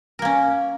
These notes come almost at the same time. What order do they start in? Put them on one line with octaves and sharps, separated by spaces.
A#4 A#3 C#4